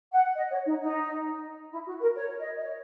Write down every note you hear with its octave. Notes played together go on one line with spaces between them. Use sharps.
F#5
D#5
C#5
D#4
D#4
E4
F#4
A#4
C#5
D#5
D#5
C#5